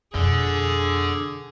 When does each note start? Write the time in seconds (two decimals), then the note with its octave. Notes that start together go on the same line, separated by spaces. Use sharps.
0.14 F2 B2 D3 G#4